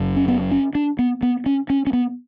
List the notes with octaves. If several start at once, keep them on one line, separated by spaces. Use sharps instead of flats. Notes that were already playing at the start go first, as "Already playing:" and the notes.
Already playing: F#1 F#2 C#3
C#4
B3
C#4
D4
B3
B3
C#4
C#4
C#4
B3